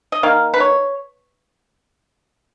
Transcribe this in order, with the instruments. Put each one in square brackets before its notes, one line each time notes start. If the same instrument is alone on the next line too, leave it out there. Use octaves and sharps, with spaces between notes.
[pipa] D#5
D#3 A#3 F5
B4
C#5